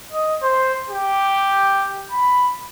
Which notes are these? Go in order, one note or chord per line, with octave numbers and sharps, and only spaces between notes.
D#5
C5
G4
B5